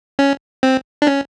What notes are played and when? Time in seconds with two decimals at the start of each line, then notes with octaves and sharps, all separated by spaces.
0.19 C#4
0.63 C4
1.02 D4
1.07 C#4